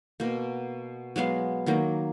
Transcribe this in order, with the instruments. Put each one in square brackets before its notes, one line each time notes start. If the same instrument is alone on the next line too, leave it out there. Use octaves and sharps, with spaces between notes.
[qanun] B2 A#3
F#3 G#3 B3 F5
D#3 F#3 A#3